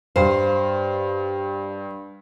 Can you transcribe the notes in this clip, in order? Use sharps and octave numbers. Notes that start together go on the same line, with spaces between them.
G2 C5 F5